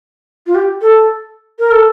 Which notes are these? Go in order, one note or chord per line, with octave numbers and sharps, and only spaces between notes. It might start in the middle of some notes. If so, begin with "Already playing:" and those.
F4
G4
A4
A#4
A4